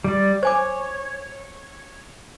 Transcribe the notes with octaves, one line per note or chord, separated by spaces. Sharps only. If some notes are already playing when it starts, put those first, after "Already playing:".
G3 D5
C5 C#5 G#5 D6